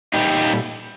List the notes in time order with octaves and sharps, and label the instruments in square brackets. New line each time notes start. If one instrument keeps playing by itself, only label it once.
[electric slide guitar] A#2 G3 D#4 G4